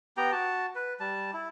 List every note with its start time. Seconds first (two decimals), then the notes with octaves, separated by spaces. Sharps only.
0.17 B3 G4 G5 A#5
0.32 F#4 A5
0.75 B4
1.00 G3 A5
1.33 E4